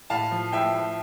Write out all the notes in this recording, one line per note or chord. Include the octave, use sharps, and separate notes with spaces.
A2 F5 A5
F3
A2 E5 G5
A2